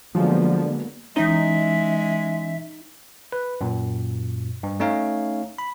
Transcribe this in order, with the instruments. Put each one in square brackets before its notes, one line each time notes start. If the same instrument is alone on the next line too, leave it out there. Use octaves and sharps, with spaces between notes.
[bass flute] D3 [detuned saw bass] F3 [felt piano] F#3 G#3 [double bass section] A#3 B3
[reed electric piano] E3 C#4 [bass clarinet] G#3 [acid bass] D#4 [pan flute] E5
[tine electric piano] B4
F#2 A#2
G2
A3 C#4 D#4 C#5 F5
B5